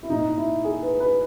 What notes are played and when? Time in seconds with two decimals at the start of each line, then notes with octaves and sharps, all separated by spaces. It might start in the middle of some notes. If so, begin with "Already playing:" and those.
0.03 E4
0.10 A#2 D#4
0.37 E4
0.64 G#4
0.82 B4
1.00 B4